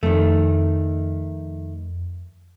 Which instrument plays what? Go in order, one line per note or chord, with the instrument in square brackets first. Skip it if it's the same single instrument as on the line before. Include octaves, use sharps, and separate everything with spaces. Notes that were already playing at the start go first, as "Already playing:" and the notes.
[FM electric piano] F2 [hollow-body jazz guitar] D#3 A3